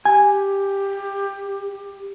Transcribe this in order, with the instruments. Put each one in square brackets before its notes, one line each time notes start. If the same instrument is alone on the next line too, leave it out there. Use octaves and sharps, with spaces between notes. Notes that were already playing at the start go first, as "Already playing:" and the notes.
[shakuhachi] G4 [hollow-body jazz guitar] G#5